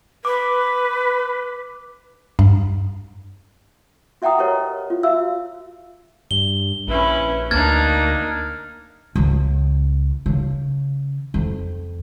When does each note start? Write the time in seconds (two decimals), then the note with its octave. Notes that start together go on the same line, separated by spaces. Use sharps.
0.25 B4 D6
2.39 G2
4.22 F#4 E5 F#5 G5 A#5 D#6
4.38 G4 A#4 B4 C#5 D#5
4.90 F4
5.03 F#4 E5 F5 E6
6.31 G2 G7
6.87 A#1 C#4 E4 B4
7.51 D2 A#3 D4 D#4 F6 G#6 A6
9.15 C#2
10.26 C#3
11.34 F2